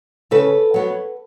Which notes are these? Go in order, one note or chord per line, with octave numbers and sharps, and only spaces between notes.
C#3 A4 B4
F#3 B3